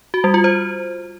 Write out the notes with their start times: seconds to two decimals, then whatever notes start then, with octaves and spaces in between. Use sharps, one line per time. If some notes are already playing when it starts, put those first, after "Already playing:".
0.14 F#4
0.24 G3
0.34 F4
0.44 C5